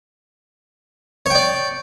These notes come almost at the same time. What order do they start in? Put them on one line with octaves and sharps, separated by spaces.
C#5 G5 D5